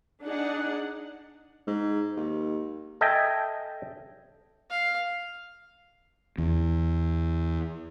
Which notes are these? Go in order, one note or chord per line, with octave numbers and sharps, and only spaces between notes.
D4 D#4 G#4 F#5
G#2
D#2
A4 D#5 E5 G5 G#5
F5
E2